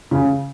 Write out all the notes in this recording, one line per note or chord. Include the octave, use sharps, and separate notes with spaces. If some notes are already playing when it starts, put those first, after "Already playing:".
C#3